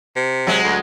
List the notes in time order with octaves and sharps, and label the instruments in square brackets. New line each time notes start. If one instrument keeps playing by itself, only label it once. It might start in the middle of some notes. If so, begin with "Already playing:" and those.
[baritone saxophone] C3
[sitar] F#3 G#3
[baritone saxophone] D2